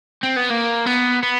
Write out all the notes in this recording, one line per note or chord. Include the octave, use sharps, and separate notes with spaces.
C4
B3
A#3
B3
B3